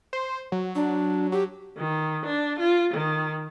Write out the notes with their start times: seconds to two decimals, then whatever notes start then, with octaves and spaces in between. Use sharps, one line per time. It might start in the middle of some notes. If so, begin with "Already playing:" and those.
0.13 C5
0.52 F#3
0.75 F#3 D4
1.32 F#3 G4
1.77 D#3
2.26 D4
2.59 F4
2.94 D#3